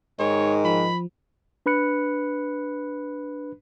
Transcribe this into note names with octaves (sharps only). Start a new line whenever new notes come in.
G#2 D#3 C#5
F3 B5
D4 B4 B5 F#6 C#7